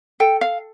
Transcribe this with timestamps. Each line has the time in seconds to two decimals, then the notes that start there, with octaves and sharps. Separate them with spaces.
0.20 A4 G5
0.41 F5